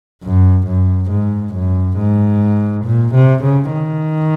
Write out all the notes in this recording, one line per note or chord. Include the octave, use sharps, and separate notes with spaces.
F#2
F#2
G#2
F#2
G#2
A#2
C3
C#3
D#3